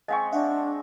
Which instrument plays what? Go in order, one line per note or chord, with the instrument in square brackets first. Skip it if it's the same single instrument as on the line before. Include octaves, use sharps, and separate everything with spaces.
[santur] G#3 C4 C#6 [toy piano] D#5 F5 G#5
[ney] D4 [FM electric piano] E5 F#5